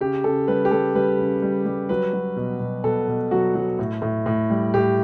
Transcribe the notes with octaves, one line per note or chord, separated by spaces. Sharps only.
C#3 G4
C#3 A4
G3 B4
G4
G3 A4
G3 B4
C#3
G3
G3
F#3 B4
F#3
B2
B2
B2 A4
B2
F#3 F#4
F#3
A2
A2
A2
G3
A2 G4